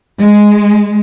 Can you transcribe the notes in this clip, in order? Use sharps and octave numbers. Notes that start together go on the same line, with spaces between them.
G#3